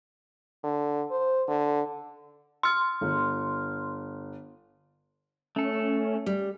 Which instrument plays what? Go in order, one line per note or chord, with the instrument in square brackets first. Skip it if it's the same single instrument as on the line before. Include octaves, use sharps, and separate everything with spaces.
[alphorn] D3
C5
D3
[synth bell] C6 F6 [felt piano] C#7
[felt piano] G1
[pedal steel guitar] A3 A4 [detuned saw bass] C#4
[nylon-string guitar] G3